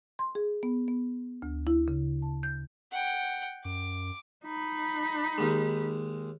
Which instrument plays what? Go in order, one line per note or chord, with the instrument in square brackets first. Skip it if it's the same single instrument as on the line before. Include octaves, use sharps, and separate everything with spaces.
[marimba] C6
G#4
B3
B3
D2
E4
C#3
A5
G6
[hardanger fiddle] F#5 G5
[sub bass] F#2 [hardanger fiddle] D6
[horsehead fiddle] D#4 B5
[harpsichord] D#2 G#3